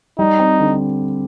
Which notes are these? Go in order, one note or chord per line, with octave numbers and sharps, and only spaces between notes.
G3 D#4
C4
D3